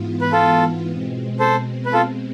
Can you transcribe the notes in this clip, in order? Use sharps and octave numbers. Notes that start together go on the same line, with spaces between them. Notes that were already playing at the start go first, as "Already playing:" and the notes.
Already playing: G#2 E3 B3 F4
B4
F4 A4
B2 G#3 C4
A4 C5
B4
F4 A4